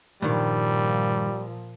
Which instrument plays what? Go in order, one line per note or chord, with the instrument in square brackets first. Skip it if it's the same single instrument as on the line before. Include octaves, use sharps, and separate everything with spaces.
[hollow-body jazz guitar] G2 D#3 [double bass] A#2 F3 [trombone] G3